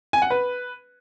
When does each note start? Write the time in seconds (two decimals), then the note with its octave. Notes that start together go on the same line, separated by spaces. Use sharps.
0.13 G#5
0.22 F#5
0.30 B4